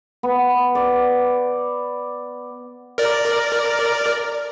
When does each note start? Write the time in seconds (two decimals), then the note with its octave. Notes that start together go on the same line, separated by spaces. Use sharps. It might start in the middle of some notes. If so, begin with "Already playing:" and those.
0.23 B3
0.75 D5
2.98 A#4 D5